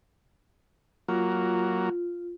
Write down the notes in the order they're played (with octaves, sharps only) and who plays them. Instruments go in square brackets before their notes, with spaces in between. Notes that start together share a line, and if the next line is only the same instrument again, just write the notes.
[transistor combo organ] F#3 A#3 [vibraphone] F4